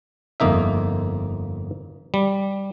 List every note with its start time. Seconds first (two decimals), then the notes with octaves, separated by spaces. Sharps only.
0.40 G1 F2 A#3 D#4 E5
2.14 G3